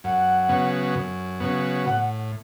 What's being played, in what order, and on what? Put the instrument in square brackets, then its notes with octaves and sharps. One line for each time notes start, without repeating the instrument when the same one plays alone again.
[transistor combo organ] F#2 [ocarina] F#5
[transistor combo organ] C#3 F#3 B3
F#2
C#3 F#3 B3
[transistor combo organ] A2 [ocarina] F#5